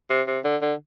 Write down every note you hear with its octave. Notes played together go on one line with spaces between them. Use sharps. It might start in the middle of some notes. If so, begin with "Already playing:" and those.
C3
C3
D3
D3